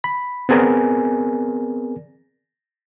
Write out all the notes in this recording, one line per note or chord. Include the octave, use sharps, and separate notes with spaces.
B5
B3 C4 G#4 A#4 D5 G#5